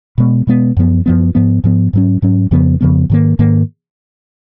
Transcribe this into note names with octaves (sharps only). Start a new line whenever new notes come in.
B2 G#3 B3
B2 G#3 B3
F#2 F3 B3
F#2 F3 B3
G#2 F3 B3
G#2 F3 B3
G#2 F#3 C#4
G#2 F#3 C#4
F2 C#3 F3 B3
F2 C#3 F3 B3
G#2 D#3 A#3
G#2 D#3 A#3